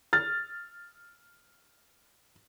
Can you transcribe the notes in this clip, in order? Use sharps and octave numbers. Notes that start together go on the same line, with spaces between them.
F6 A6